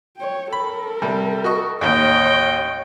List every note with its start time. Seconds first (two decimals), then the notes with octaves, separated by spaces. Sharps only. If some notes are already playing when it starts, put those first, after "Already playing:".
0.17 C#5 G5
0.53 A4 A#4 B5
1.02 C3 G3
1.44 F#4 D#5 C#6
1.81 A1 D#2 C#5 D#5 G5